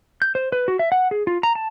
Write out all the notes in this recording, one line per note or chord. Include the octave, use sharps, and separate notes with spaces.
G6
C5
B4
F#4
E5
F#5
G#4
F4
A#5
A5